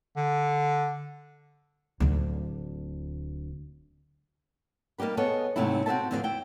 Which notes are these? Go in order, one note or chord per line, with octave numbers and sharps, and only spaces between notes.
D3
D1 D2
G3 A#3 D#4 G4 B4
B3 G#4 A4 C#5 D#5
G#2 C3 F#3 A3 C4 E4
C4 F#4 A4 C5 E5 A5
F2 A2 D3 E3 F#4 F5
E4 G5